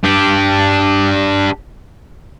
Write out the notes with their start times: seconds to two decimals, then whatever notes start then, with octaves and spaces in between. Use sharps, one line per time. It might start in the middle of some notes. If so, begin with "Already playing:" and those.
0.04 D4 G4